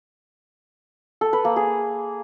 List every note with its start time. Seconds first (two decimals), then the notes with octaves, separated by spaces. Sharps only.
1.21 A4
1.33 B4
1.45 A#3
1.56 G#4